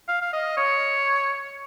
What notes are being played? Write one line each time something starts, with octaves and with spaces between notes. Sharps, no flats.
F5
F5
D#5
C#5